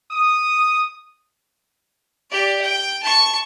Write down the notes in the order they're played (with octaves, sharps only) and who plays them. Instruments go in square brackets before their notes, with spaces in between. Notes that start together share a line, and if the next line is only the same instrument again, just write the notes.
[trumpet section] D#6
[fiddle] G4 D5
G5
A5 C#6